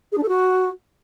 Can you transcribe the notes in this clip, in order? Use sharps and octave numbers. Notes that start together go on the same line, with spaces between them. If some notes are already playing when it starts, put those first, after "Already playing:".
G#4
D4
A4
F#4